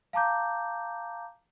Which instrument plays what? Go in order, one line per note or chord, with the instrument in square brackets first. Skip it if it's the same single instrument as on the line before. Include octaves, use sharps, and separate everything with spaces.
[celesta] F5 A5 A#5 D6 G6